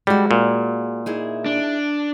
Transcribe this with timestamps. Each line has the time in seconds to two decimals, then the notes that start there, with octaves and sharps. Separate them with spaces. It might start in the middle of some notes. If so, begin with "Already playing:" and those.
0.07 G3 G#3 F#4
0.31 A#2
1.06 D#4 E4 G#4
1.46 D4